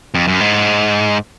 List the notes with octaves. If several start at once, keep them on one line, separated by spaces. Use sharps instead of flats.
F2
F#2
G#2